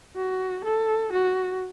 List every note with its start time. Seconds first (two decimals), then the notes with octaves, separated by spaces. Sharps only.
0.16 F#4
0.64 A4
1.12 F#4